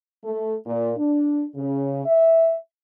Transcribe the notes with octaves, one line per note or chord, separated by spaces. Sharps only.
A3
A#2
D4
C#3
E5